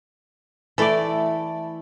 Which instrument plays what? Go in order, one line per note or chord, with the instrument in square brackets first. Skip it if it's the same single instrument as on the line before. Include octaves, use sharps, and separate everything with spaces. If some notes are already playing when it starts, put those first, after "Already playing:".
[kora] E3 A3 D5 [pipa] E4 A4